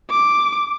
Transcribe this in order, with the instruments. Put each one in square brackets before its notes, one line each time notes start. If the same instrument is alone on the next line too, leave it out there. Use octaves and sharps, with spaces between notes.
[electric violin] D6